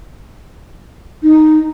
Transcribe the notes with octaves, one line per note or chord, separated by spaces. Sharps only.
D#4